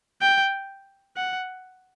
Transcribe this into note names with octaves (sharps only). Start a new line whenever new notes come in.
G5
F#5